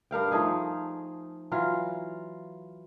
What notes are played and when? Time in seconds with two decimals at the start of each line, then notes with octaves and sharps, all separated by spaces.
0.11 G2 A#4 F5 G5
0.31 F3 A3 D#4 G#4
1.52 E3 F#3 F4 F5